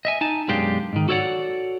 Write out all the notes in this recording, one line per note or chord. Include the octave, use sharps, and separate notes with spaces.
D#5 E5 G#5
D#4 G#5 A5
B1 F#2 G#3 D4 G4 F5
G#2 D#3
F#4 A4 C#5 D5 F#5